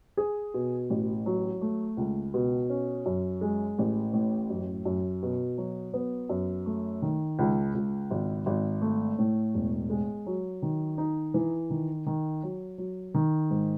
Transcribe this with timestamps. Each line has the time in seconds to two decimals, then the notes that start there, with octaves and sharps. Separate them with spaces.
0.17 G#4
0.54 B2
0.90 A1
1.26 F#3
1.61 A3
1.97 C#2
2.34 B2
2.69 C#4
3.06 F#2
3.41 G#3
3.78 A1
4.13 A2
4.50 F#2
4.85 F#2
5.23 B2
5.58 F#3
5.94 B3
6.29 F#2
6.66 A3
7.02 D#3
7.39 C#2
7.74 C#2
8.11 G#1
8.46 G#1
8.82 A3
9.19 A2
9.54 E1
9.90 G#3
10.26 F#3
10.62 D#3
10.98 D#4
11.34 E3
11.70 D#3
12.06 D#3
12.43 F#3
12.78 F#3
13.14 D#3
13.51 G#2